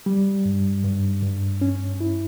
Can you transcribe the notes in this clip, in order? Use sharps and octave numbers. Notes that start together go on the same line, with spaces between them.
G3
G2
G2
G2
C#4
E4